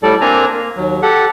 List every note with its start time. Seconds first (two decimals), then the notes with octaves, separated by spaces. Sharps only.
0.03 A2 G3 A4 D5
0.21 A#3 C4 D4 G#5 A#5
0.53 A#3
0.76 D#2 F#3
1.02 G4 A4 F#5